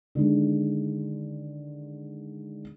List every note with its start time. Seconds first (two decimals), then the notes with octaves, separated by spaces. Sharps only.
0.15 D3 D#3 G#3